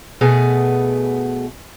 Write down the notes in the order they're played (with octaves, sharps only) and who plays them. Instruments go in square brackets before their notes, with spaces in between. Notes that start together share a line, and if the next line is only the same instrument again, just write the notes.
[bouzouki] B2 A3 B3 G#4